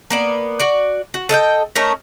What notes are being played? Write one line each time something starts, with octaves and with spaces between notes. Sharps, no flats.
A#3 B3 D5
F#4 D5
F#4
A4 D#5 F5 G5
A3 C#4 D#4 A#4